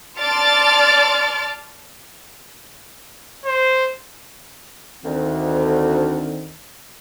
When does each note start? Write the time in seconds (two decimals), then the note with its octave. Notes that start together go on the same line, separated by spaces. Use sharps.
0.20 D5 A5 C6 F6 A6 D7
3.46 C5
5.04 D2 D#3 C4